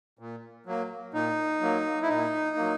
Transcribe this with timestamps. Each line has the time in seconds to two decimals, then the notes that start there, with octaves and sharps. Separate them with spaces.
0.19 A#2
0.66 F#3 A#3
1.13 A#2 D#4
1.61 F#3 A#3
2.02 E4
2.09 A#2 D#4
2.57 F#3 A#3